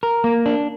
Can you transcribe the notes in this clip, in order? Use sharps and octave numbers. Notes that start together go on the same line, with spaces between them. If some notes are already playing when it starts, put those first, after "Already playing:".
A#4
A#3
D4